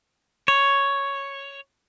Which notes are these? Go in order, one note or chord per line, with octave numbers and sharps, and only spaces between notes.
C#5